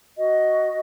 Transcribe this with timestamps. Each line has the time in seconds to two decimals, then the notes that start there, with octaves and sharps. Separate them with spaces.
0.18 F#4 D#5